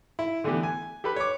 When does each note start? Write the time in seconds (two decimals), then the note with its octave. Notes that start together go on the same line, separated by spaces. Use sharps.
0.19 E4
0.44 D3 E3 A3 B3 G4
0.63 G#5
1.04 G4 A4 B4 B5
1.16 C#5 D6